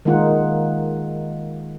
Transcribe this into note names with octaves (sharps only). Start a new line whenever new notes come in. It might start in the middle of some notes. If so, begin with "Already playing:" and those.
D#3 G#3 A#3 D#4 F4 F#5